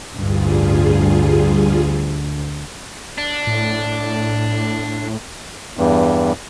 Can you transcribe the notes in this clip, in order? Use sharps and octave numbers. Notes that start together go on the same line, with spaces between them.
A1 D2 G2 G3 F4 G#4
D4
A2
E2 G2